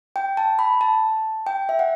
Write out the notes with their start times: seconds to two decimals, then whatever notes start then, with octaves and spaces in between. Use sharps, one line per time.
0.16 G5
0.37 A5
0.59 B5
0.81 A5
1.47 G5
1.69 E5
1.79 F#5